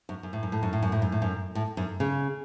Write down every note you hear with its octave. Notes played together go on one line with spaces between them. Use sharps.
F#2
F#2
A2
F#2
A2
F#2
A2
F#2
A2
F#2
A2
F#2
A2
F#2
C#3